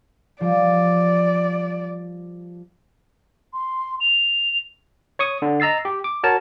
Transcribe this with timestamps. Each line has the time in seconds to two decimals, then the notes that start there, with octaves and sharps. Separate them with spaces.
0.41 F3 G3 D5
3.53 C6
4.00 F7
5.19 C#5 C#6 D#6
5.42 D3
5.60 D#5 A#5 E6 A6 C7
5.85 G4
6.04 D6
6.23 F#4 A#4 C#5 A5